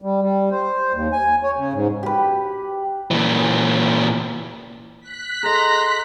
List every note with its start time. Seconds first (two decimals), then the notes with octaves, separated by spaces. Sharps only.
0.02 G3
0.22 G3
0.51 C5
0.93 D#2
1.13 G#5
1.43 C#5
1.56 C#3
1.73 G#2
2.03 G4 B4
3.11 A#2 E3
5.01 F#6 B6
5.43 G#4 A4 D#5 A#5 C6